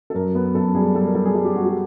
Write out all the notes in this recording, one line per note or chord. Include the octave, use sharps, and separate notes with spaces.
A4
F#2 A#4
B3
F#2 A4
G3 G#4
G3 A4
A#4
G3 A4
G#4
G3 G4
G4
G3 F#4
G4